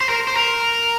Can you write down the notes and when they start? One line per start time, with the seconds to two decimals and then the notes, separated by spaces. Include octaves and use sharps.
0.01 C5
0.09 A#4
0.27 C5
0.36 A#4